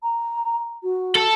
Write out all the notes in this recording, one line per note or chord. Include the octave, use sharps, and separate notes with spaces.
A#5
F#4
A4